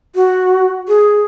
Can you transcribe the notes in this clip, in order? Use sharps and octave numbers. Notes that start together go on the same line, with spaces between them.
F#4
G#4